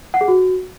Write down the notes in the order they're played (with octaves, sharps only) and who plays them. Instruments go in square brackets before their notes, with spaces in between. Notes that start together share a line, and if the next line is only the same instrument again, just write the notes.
[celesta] F#5
G#4
F#4